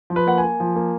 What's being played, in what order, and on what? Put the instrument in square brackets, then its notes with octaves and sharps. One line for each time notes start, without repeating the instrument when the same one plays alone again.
[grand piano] F3
B4
A#3 F#5
G#5
A#3
F3
A#3